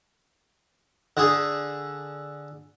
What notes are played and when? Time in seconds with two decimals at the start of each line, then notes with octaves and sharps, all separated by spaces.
1.17 D3 G#4